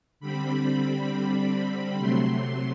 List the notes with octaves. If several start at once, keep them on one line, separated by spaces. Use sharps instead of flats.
D3 G3 C4 B5
C3 F#3 A3 C6
C6